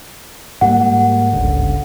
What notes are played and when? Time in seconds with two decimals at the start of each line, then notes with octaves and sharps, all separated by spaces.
0.61 G#2 G3 A#3 F#5
1.33 G1 C#2 D3